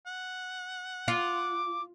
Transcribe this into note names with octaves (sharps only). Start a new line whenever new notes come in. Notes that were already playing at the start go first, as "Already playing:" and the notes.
F#5
F4 D6